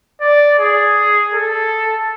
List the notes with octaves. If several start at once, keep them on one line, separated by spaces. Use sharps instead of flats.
D5
G#4
A4